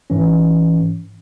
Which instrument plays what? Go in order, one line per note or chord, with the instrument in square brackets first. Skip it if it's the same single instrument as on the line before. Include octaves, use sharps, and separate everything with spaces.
[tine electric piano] G#2 E3 C#4